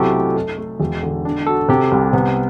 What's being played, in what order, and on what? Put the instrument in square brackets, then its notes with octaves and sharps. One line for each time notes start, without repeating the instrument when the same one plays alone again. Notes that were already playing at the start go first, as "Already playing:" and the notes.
Already playing: [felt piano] B1 C3 [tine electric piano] E4 F#4 G4 A4
[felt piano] A3
A4
A3
E1
D3
D4
[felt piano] F#4 [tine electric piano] A4
[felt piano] C3 [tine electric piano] G4
[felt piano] C2
[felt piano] C3 [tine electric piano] B3